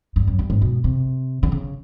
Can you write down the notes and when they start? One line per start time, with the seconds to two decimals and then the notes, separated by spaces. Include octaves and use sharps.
0.16 G2
0.28 F#2
0.39 G2
0.50 G#2
0.62 B2
0.84 C3
1.43 D3
1.52 C#3